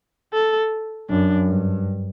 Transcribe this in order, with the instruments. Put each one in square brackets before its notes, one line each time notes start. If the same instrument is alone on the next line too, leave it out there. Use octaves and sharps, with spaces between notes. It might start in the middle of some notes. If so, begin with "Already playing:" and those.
[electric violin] A4
[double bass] F#2 [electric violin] D4
[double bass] G2